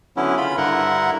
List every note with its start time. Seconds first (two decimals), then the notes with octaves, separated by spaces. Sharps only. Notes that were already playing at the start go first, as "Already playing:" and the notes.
0.17 D3 F#3 B3 C#4 E4
0.37 C#3 F4 B5
0.57 G2 D3 E4 A#4 F#5